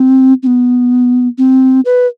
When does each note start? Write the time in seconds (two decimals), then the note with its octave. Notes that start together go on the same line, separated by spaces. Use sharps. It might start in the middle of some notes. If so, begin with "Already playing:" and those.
Already playing: C4
0.43 C4
0.47 B3
1.38 C4
1.85 B4